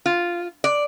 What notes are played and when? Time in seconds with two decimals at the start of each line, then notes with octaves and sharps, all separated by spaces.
0.06 F4
0.64 D5